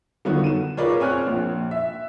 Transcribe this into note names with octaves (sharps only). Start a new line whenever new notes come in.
D3 D#3 F#3 B3 F4 F#4
D#7 E7
F4 G#4 A#4 B4 C#5 D5
C4 C#5 G#5 F6 F#6
A#1
E5